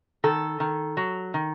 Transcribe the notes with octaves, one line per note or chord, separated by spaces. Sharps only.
D#3 A4
D#3
F#3
D#3